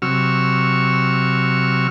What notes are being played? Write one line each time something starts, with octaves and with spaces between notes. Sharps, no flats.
C3 F#3 C#6 E6 F6